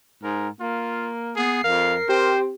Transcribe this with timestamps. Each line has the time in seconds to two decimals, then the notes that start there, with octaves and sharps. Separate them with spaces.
0.23 G#2 A#4
0.60 A#3 F4
1.36 B3 G#4 C7
1.64 F2 A#4 F5
2.09 C4 G4 C5